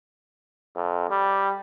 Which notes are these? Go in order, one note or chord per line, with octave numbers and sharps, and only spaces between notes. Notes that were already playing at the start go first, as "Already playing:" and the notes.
F2
G3